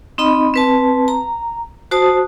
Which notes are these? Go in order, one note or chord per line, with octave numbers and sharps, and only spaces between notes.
C4 D#4 D#5 B5
C4 B4 A5
A#5
F#4 C5 A5 D#6